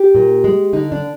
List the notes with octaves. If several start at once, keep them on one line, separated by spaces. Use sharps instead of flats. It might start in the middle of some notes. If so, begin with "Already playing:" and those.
Already playing: G4
A#2
G#3
D3 D#4
D4